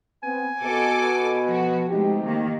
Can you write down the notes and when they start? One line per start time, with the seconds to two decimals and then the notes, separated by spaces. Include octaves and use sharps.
0.23 B3 C4 G#5
0.63 B2 A4 D6
1.45 F3 F#4
1.89 C3 G#3 A3 D#4 G4
2.26 D#3 A#3